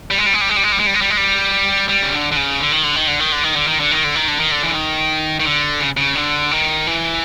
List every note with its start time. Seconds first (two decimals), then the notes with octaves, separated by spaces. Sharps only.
0.11 G3
0.18 G#3
0.26 G3
0.34 G#3
0.41 G3
0.49 G#3
0.57 G3
0.63 G#3
0.72 G3
0.80 G#3
0.87 G3
0.94 G#3
1.01 G3
1.10 G#3
1.17 G3
1.89 G3
2.02 C#3
2.12 D3
2.32 D3
2.36 C#3
2.60 D3
2.72 D#3
2.84 D3
2.96 D#3
3.08 D3
3.20 D#3
3.32 D3
3.44 D#3
3.56 D3
3.67 D#3
3.80 D3
3.92 D#3
4.04 D3
4.15 D#3
4.28 D3
4.40 D#3
4.51 D3
4.63 E3
4.73 D#3
5.40 D#3
5.45 D3
5.80 C#3
5.97 C#3
6.15 D3
6.51 D#3
6.87 E3